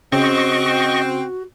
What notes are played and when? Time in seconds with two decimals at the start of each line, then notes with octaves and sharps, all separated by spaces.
0.12 C#3 C4 F#4 D#5 C#6